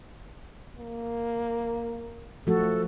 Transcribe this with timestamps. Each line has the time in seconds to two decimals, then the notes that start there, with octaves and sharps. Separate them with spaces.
0.78 A#3
2.47 F3 A3 F#4 A4